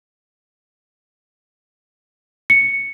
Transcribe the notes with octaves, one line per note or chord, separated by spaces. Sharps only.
C#7